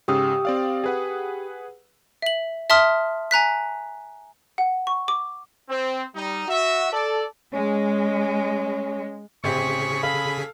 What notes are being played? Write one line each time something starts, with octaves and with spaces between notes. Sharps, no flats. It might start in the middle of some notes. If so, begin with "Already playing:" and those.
G#2 C#3 G4 G5 D#6 E6
C4 D5 F5
G#4 B4 F#5
E5 F#7
E5 A5 C6 D#6 F6
G#5 A#5 F#6 B6
F#5
C#6
D6
C4
G3 D#4
F#4 E5
A4 D5
G#3 C#4
A1 C#3 C4 G4 G#4 C#6 B6
A4 F5 B5